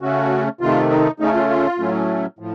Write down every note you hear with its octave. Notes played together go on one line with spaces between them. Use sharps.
C#3 A3 C#4 F#4
C3 D#3 A3 F4
D#4
C#3 A3 C#4 D#4
F4
F4
A2 F#3 A3 C#4
A2 F3